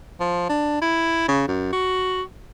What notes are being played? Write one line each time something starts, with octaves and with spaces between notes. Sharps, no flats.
F3
D4
E4
C#3
F#2
F#4